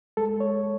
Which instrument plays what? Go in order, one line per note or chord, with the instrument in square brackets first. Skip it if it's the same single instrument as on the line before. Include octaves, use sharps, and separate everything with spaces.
[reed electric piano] G#3 A4
C#5